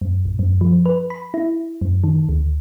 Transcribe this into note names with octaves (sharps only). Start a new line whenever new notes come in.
F#2
A#1
F#2
F3
B4
B5
E4
F#2
D#3
D2